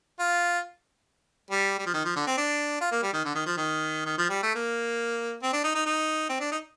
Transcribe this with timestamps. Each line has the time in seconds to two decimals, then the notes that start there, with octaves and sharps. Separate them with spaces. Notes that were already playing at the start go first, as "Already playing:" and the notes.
0.20 F4
1.51 G3
1.78 G3
1.86 F3
1.94 D#3
2.05 F3
2.16 D3
2.27 C4
2.38 D4
2.81 F4
2.91 A#3
3.03 G3
3.13 D#3
3.25 D3
3.35 D#3
3.46 F3
3.57 D#3
4.05 D#3
4.18 F3
4.30 G3
4.43 A3
4.55 A#3
5.43 C4
5.53 D4
5.64 D#4
5.74 D#4
5.86 D#4
6.29 C4
6.40 D4
6.52 D#4